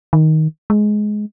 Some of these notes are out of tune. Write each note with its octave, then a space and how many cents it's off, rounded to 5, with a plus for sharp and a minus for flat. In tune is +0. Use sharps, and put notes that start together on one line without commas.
D#3 +10
G#3 +15